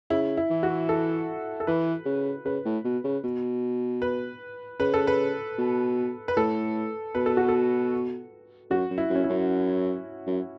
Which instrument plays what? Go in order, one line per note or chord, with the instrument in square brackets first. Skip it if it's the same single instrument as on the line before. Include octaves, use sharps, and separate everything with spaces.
[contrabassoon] C#3 [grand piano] E4
[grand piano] E4
[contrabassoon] E3
[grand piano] F#4
A4
A4
[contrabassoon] E3 [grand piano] B4
[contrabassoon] C#3
[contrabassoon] C#3 [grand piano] B4
[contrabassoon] A2
B2
C#3
B2
[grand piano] B4
[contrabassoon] C#3 [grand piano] B4
[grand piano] A4
B4
[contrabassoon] B2
[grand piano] B4
[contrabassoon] A2 [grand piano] A4
[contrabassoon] B2 [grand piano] B4
[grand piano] A4
F#4
A4
[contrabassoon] F#2 [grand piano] F#4
[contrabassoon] F#2
[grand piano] E4
[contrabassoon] F#2
[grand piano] C#4
E4
[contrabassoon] F#2
F#2